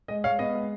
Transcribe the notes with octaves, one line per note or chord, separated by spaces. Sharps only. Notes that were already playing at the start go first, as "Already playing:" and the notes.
G#3 D#5
G#3 C#5 F5
B3 D#5
G#3